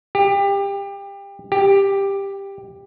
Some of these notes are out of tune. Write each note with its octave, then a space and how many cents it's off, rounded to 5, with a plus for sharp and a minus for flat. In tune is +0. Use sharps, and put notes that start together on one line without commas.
G4 +25
G4 +10